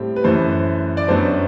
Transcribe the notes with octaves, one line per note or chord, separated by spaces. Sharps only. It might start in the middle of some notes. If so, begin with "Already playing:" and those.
Already playing: A2 G3 C4
B4
F#2 E3 A3 C5
D5
F#2 F#3 B3 D4 C5